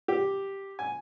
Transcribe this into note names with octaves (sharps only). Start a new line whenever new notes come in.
G4
G#5